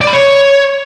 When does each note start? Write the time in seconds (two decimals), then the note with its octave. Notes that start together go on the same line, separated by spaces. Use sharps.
0.01 D5
0.07 B5
0.13 C#5